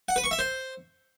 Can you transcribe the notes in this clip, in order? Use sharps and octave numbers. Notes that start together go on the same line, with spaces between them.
F#5
B4
C#6
E5
C5